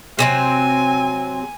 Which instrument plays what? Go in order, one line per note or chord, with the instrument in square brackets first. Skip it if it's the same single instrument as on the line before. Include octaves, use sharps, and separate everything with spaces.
[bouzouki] C3 F#3 C4 [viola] G#5